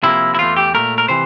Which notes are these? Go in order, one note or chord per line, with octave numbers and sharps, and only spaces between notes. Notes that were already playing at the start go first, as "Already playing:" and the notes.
C3 F3 A#3 E4
E4
E2 E3 A3 F4
G4
A#2 A3 A#4
A#4
C3 E3 C5